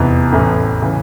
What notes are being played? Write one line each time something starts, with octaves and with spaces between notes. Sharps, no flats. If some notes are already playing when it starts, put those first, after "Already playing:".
Already playing: F1 E2 E3
A1 A2 E3
C#3 E3